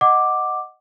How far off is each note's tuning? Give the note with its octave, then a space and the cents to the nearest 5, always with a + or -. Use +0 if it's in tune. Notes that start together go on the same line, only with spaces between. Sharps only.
D#5 +0 F#5 +0 D6 +5